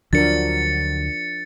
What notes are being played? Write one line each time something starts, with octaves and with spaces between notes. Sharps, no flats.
D2 D3 F3 F#3 D4 A#4 A6 C#7